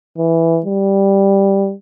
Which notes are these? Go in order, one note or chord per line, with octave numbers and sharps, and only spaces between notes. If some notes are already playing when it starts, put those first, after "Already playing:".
E3
G3